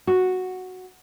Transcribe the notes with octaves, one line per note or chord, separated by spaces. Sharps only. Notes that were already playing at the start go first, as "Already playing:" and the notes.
F#4